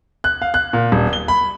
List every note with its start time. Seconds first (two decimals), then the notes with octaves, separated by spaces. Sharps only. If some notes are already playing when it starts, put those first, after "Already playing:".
0.24 F#6
0.42 F5
0.54 F#6
0.73 A#2
0.92 D#1
1.13 G7
1.28 B5